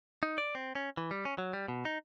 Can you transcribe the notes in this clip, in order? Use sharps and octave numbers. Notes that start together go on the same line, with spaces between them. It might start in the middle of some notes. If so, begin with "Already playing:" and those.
D#4
D5
C4
C#4
E3
G3
C#4
F#3
G3
B2
D#4